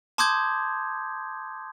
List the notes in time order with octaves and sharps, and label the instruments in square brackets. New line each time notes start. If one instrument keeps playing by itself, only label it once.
[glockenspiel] A5 C6 D6 D#6 G6 G#6